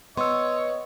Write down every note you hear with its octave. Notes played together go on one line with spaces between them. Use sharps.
B3 C#5 D#5 C6 C#6 E6